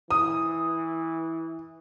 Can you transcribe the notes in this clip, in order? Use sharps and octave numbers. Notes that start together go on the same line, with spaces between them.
E3 D#6